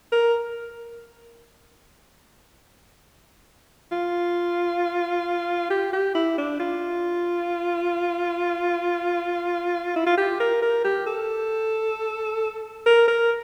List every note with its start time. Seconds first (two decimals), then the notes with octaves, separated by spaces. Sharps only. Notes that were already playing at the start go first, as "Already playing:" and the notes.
0.12 A#4
3.92 F4
5.70 G4
5.93 G4
6.15 E4
6.38 D4
6.60 F4
9.96 E4
10.06 F4
10.18 G4
10.40 A#4
10.62 A#4
10.85 G4
11.06 A4
12.86 A#4
13.08 A#4